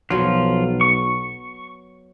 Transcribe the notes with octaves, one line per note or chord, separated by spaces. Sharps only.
B1 F3 F#3 B3 F4
C#6